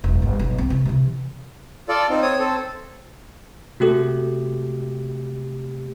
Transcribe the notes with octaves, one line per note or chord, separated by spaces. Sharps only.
E1 B1
G1
B1
C4
C3 E3
C3 E3
F4 A4 D5
C4 D#4
C4 C#5 D#6
C4 A4
C3 A3 F#4 G4 A4